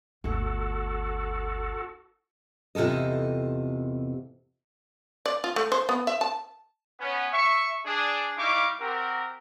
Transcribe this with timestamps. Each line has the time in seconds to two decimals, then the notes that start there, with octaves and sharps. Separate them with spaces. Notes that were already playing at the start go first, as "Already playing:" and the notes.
0.24 G1 D2 F#4 A4
2.75 E2 C3 F4 A4 D#5
5.26 D5
5.44 F4
5.56 A3
5.72 C5
5.89 B3
6.07 E5
6.21 A5
7.00 B3 C#4
7.32 E5 C#6
7.86 D4 G#4
8.38 G3 D#4 E4 F5 C#6 D6
8.80 C4 F#4 G4 A#4